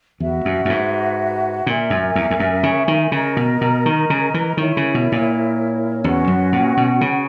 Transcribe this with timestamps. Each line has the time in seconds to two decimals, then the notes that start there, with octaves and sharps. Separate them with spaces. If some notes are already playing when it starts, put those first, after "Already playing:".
0.20 E2 F#4 B4 E5
0.45 F#2
0.65 F#2
0.69 G#2
1.66 A#2 A#4 E5 G#5
1.90 F#2
2.15 E2
2.31 E2
2.40 F#2
2.63 C#3
2.88 D#3
3.12 C#3 A#4 D#5 A#5
3.37 B2
3.61 B2
3.86 D#3
4.10 C#3
4.34 E3
4.57 D#3 E4 A#4 C#5
4.77 C#3
4.94 B2
5.12 A#2
6.04 E2 C#4 F#4 B4 F#5
6.28 F#2
6.52 A#2
6.77 B2
7.01 C#3